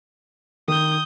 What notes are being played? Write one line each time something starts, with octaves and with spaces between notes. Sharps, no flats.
D#3 D#6 G6